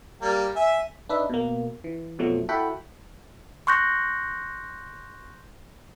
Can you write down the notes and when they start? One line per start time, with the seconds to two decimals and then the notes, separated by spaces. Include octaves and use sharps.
0.21 G3 A#3
0.56 E5 G#5
1.09 D4 D#4 B4 E5
1.29 B2 A#3
1.84 E3
2.19 F2 B2 F3 F#3 A3
2.49 E4 F#4 A4 F#5 G5 B5
3.67 C6 C#6 F#6 G6 A#6